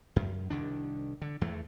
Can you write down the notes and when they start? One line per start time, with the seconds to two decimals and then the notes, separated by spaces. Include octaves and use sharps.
0.16 F#2
0.50 C2 D#3 D4
1.22 D3
1.41 E2 E3 A3